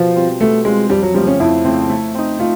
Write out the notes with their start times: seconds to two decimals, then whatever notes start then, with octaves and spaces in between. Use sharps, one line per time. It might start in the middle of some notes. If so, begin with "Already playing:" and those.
Already playing: B2 F3
0.15 G3 C4 F4
0.40 B2 A3
0.65 G3 G#3 C4 F4
0.90 F2 G3
1.03 F#3
1.14 C#3 F3 G3 A3 C4
1.27 C#4
1.40 F2 E4
1.65 C#3 F3 A3 C4
1.90 A3
2.15 C4 D#4
2.39 A3 F4